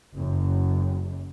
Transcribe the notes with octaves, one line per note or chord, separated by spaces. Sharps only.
F#1 F#2